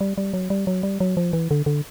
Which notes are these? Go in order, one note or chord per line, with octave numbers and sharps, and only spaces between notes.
G3
G3
F#3
G3
F#3
G3
F#3
F3
E3
D3
D3